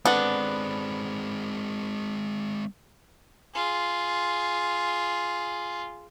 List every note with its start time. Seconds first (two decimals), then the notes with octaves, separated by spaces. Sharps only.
0.05 G#3 B3 C4 D4 A4 F#5
3.54 F4 G#4